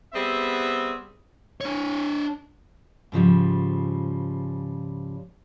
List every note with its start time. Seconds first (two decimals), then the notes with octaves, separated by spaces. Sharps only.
0.14 G3 B3 C4 G#4 E5
1.61 D4 C#5
3.12 G#2 C#3 F3 G3